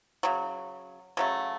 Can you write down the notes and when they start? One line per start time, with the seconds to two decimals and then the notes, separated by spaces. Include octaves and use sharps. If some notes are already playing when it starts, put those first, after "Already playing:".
0.23 C#3 F#3
1.17 C#3 F#3 A3